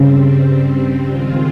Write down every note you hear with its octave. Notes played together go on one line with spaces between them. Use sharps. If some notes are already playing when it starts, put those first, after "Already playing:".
Already playing: G2 C#3 G3 C4
D#3 G#3 C4 F4